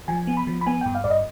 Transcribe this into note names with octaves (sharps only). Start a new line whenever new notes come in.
F3 G#5
B3
B5
F3
B5
B3 G#5
G2 G5
F5
G2 D5
D#5